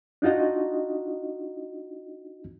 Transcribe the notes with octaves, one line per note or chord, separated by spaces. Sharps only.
D4 D#4 F4 F#4 D#5